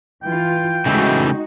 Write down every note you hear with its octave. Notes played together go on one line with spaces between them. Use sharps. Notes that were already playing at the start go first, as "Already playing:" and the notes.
E3 F4 G5
C#3 E3 G#3 A3 D#4 F#4